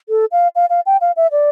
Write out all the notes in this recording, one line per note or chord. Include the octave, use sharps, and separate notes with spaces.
A4
F5
F5
F5
G5
F5
E5
D5